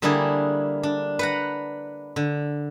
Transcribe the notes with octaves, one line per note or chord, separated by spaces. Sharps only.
D3 G3 A#3 D4 E4 G#4
D4
B4 F#5 A#5
D3